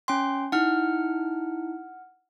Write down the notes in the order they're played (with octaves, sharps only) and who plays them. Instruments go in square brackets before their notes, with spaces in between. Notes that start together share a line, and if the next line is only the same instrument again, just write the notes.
[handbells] C#4 G5 C6
[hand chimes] D#4 E4 [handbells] F#5 F6